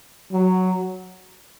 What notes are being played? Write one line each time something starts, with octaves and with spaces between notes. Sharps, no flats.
F#3